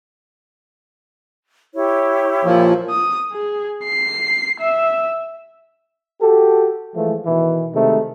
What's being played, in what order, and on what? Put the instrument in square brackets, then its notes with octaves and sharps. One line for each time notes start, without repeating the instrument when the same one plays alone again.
[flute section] E4 G4 C#5
[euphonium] A#2 [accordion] F3
[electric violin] D#6
G#4
C7
E5
[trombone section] F#4 G4 A4
E3 F3 G#3 A3
B2 D#3 E3
C3 D#3 G#3 A3